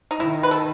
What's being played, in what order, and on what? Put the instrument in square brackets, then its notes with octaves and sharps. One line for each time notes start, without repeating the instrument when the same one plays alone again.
[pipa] D#4
[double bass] D#3 [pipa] E4
[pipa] B4
A4